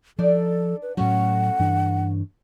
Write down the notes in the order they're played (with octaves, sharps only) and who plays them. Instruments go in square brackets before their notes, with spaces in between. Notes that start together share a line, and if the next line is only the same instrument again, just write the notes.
[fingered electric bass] F3 [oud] D4 D#4 D5 [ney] A4
[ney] B4
[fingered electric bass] A2 F#3 [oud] A3 C#4 F#4 [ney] F#5
[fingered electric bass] G2 E3 D4